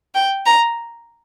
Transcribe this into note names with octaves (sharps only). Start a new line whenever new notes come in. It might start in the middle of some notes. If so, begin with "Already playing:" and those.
G5
A#5